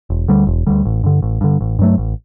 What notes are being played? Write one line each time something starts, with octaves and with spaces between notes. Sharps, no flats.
E1
D2 D3 G3
E1
D2 D3 G3
A1
G2 D3
A1
G2 D3
A1
G2 F#3 A3
A1